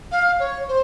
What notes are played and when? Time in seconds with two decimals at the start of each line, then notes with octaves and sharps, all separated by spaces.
0.12 F5
0.39 C#5
0.68 C5